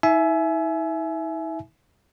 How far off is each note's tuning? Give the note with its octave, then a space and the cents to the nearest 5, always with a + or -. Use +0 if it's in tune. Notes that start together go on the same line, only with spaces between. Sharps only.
E4 -45 E5 +5 G#5 +30